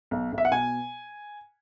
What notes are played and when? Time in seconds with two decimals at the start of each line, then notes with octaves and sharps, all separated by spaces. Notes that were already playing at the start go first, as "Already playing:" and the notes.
0.11 B1
0.32 B1
0.38 E5
0.45 F#5
0.51 B2 G#5